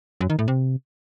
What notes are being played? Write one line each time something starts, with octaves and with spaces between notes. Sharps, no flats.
F#2
D#3
A2
C3